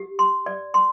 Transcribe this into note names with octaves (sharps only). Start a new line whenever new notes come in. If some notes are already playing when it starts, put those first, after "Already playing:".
Already playing: G4
C6
D5
C6